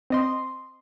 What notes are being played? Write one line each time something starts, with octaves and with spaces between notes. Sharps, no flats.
C4 D#5 C6